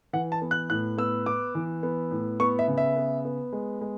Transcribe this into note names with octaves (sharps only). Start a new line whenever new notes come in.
E3 F#5
A5
B3
F#6
A2 F#6
B3 E6
B3 D6
E3
B3
A2
B3 C#6
E5
C#3
E5
B3
B3
G#3
G#3